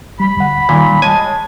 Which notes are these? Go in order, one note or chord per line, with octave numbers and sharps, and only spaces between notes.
G3 B5
D2 F#5
A#2 D#3 G3
G#3 C#5 G#5 A5